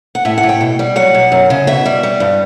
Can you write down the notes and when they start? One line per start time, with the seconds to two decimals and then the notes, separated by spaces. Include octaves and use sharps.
0.15 F#5
0.25 A2 E5
0.38 F#5
0.43 A2
0.49 G5
0.61 B2
0.79 G3
0.96 F#3 F#5
1.14 B2
1.32 F#2
1.50 C#3
1.67 B2 E5
1.85 G3
2.03 G3
2.20 G2